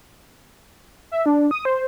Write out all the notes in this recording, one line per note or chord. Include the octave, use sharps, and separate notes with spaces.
E5
D4
D#6
C5